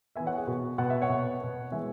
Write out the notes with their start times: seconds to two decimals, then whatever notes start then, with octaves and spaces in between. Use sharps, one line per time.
0.16 E3 B3 E5 G#5
0.26 C#5 F#5
0.37 G#4
0.47 B2 B3 F#4 B4
0.78 B2 B3 F#5
0.90 E5
1.02 C#5 F#5
1.10 B2 B3
1.41 B2 B3
1.71 E3 G#3 B3 E5 G#5